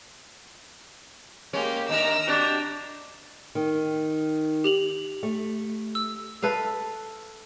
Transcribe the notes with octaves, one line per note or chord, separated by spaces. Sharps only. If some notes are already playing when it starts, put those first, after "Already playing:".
G#3 A#3 C#4 G4 C#5
D#2 D4 A#4 D#5 A#5 E6
D4 F#4 G4
D#3
G4 F7 F#7
A3
E6
A4 B4 E5 F5